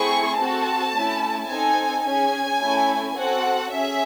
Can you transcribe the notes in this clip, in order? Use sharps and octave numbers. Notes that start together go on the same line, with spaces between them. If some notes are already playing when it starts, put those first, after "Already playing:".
Already playing: A3 C4 E4 G#4 C#6
C4 F#4 A4 A5
A3 C#4 E4
C4 D#4 A4 G#5
C#4 G#4 G#5
A3 C#4 E4 A4
C4 F#4 A4 F#5
C#4 G#4 E5